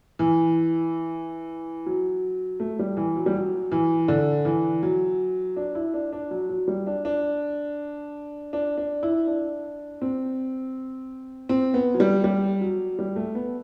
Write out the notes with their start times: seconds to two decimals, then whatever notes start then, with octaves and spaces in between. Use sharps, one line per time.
0.19 E3
1.86 F#3
2.60 A3
2.79 G3
2.97 E3
3.16 F#3
3.26 G3
3.34 F#3
3.72 E3
4.08 D3
4.45 E3
4.83 F#3
5.57 D4
5.75 E4
5.94 D4
6.13 D4
6.31 F#3
6.49 F#3
6.68 G3
6.87 D4
7.05 D4
8.53 D4
8.78 D4
9.03 E4
9.27 D4
10.02 C4
11.49 C4
11.74 B3
11.94 F#3
12.00 G3
12.24 G3
12.61 F#3
12.99 G3
13.16 A3
13.35 B3